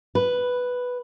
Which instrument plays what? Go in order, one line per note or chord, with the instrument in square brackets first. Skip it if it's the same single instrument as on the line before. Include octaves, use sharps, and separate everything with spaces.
[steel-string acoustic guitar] B4